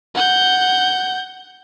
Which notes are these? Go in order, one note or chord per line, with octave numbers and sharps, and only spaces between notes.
F#5 G6